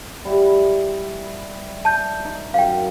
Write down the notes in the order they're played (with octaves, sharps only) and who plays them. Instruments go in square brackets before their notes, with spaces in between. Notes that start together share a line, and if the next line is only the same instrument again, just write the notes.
[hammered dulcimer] G3 E4
[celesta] A5 G6
[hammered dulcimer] D#4
[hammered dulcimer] F#2 [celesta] F5 G5